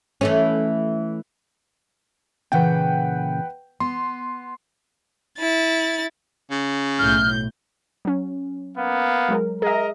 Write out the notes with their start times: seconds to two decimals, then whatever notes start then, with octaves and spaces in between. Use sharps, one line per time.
0.21 E3 A3 C#4
2.52 A#2 C#3 E3 B4 F#5 G5
3.80 B3 C6
5.38 E4 A6
6.51 C#3
6.99 B1 A2 F6 G6
8.05 F#3 C#4
8.77 A#3 B3 F5
9.29 F#3 G#3 A#4
9.62 G#4 A#4 D#5 E5 A#5